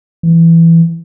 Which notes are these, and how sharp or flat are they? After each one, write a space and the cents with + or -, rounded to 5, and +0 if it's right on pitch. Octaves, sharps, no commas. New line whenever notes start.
E3 +10